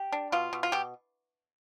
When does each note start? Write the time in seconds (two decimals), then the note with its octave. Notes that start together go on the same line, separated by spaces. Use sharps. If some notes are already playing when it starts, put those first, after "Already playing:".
Already playing: G4
0.12 D4
0.32 B2 F4
0.53 B2
0.63 F4
0.72 B2 G4